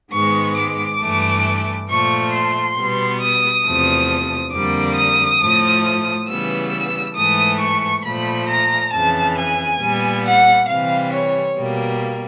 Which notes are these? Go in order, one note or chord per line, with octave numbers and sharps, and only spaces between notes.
G#2 D#3 G#3 B3 C#6
D6
G2 E3 A3
A#2 F3 A3 C#6
C6
B2 G3 B3
D#6
E2 C3 F3 A3
F2 D3 G3 A#3 D6
D#6
A2 F3 A3
C#3 E3 G3 B3 E6
G#2 E3 A3 D#6
C#6
A#2 F3 A3 B5
A#5
F2 C#3 E3 A5
G#5
A#2 G3 B3
F#5
C3 E3 G3 F5
C#5
B2 G3 A#3